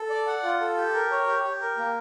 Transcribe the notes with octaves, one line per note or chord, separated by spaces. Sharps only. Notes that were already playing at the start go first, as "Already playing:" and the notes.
Already playing: A4
D5
F#5
F4
A4
G4
A#4
C#5
G4
G4
A#4
A#3